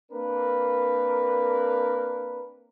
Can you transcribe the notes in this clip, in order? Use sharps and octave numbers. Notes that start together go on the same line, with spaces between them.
A#3 C4 D4 A#4 B4